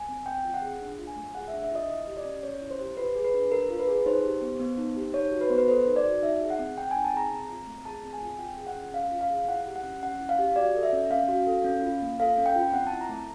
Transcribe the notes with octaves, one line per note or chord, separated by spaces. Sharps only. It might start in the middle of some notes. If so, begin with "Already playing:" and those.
Already playing: G#5
C4
C4 G5
F4
F#5
G#4
D4
F4
G#5
A3
G#4 F#5
E5
D4
E5
F4 D#5
E4 D#5
G4
D5
C#4
C#4 C#5
E4
C5
G4
F4 B4
G#4
B4
D4
D4 A#4
F4
B4
G#4
D#4 C5
G4
B3
B3
D#4
G4
D#4 C#5
F#4
B4
B3 C5
B4
A4 C5
D#4
D5
F#4
D#4 E5
G#4
F#5
C4
C4 G5
D#4 G#5
A5
G#4 A#5
C4
F4
A3
G#4 A5
C4
G#5
F4
F4 G5
G#4
F#5
C#4
C#4 F5
F4
F5
G#4
E4 F#5
G4
F#5
C#4
C#4 F#5
E4
F5
G4
F#4 D5
A4
E5
C#4
C#4 F5
F#4
A4
C#4
F4
A#3
A4 F5
C#4
G5
F4
C4 F#5
E4 A5
A#5
A3